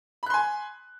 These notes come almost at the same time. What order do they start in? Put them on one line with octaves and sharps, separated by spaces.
B5 F#6 C6 G#5